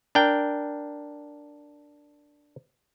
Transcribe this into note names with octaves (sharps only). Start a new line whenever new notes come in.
D4 A#4 G5